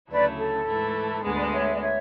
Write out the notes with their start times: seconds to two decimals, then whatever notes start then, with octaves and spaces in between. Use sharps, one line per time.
0.10 D2 C#3 F#3 A3 E4 B4 D5
0.38 A4
0.67 G#2 E3 A3 E4
1.24 D2 D3 G#3 B3 G#4
1.33 B4 D5
1.53 C#5 E5
1.74 D5
1.81 C#5 E5